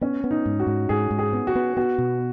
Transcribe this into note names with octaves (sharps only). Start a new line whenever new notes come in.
B3 C#4
B3
D#4
G#2
F#4
G#2
G#2 G#4
G#2
G#4
B3
F#4
B3
B3 F#4
B2